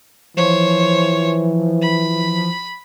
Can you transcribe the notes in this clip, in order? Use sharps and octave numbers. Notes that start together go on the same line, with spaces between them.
E3 F3 C5 C#5
B5